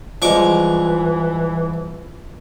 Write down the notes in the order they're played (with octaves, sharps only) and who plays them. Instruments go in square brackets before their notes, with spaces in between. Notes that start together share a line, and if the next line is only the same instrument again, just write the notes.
[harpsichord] C2 C#6 D6 [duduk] E3 [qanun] F3 G#3